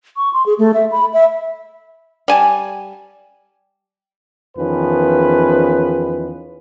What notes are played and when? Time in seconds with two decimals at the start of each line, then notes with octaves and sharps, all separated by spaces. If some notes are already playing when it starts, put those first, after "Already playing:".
0.17 C#6
0.33 C6
0.46 G#4
0.59 A3
0.74 E5
0.92 B5
1.13 E5
2.28 G3 G#5 A5
4.57 E2 D#3 F3 C#4 B4